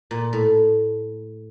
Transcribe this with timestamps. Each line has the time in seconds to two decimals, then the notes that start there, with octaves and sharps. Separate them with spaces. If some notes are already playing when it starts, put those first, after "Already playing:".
0.11 A#2
0.33 A2